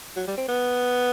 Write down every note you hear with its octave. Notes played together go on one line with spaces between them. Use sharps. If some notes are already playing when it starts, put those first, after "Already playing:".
F#3
G3
C4
B3